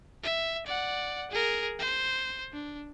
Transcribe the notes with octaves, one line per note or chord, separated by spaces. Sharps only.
E5
D5 F#5
G#4 A#4
C5
D4